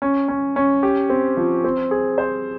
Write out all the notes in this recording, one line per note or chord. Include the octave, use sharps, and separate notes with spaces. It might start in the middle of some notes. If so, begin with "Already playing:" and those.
C#4
C#4
C#4
G4
C4
F3
C4
G#4
C5